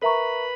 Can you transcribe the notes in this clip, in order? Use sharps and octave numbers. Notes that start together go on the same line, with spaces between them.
A#4 B4 E5 A#5 B5 C#6